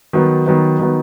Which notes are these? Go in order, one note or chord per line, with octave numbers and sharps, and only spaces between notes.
D#3 F#3 B3 D#4
D#3 F#3 B3 D#4
D#3 F#3 B3 D#4